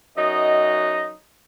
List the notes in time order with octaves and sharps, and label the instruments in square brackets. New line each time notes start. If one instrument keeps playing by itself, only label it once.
[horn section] F#2 F#3 D#4 D#5